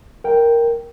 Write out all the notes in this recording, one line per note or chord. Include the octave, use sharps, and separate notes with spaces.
A#4 G5